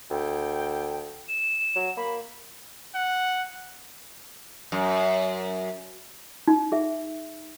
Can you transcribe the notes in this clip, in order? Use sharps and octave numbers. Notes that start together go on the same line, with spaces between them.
D2 G5
E7
F#3
A#3 B5
F#5
F#2
D#4
G#4 E5